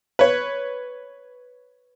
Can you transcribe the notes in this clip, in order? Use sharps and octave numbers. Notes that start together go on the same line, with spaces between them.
B4 C#5